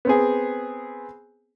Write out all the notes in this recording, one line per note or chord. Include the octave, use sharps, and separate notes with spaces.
B3 C4 G#4